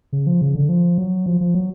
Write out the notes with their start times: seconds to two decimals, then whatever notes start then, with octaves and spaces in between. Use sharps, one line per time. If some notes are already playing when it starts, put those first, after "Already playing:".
0.13 C#3
0.27 F3
0.41 C#3
0.55 D3
0.69 F3
0.98 F#3
1.26 F3
1.41 F3
1.54 F#3